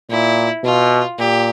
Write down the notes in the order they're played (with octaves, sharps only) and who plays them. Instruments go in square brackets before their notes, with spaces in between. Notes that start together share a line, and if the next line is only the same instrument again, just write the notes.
[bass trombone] A#2 [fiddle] E4
[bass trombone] B2 [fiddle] F4
[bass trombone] A#2 [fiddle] G4